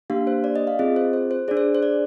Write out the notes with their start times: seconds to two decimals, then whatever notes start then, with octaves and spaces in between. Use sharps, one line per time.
0.10 A#3 D4 G4 F5
0.27 C5
0.44 D5
0.56 D#5
0.67 F5
0.79 C4 F4 G#4 D#5
0.96 C5
1.13 C5
1.31 C5
1.48 D4 G#4 D5
1.57 C5
1.75 C5
1.83 D5